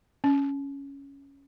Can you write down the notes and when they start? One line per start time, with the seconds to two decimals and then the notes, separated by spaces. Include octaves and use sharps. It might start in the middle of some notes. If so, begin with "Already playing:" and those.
0.24 C#4